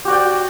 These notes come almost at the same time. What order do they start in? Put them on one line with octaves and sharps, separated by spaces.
G4 F#4 D5 G5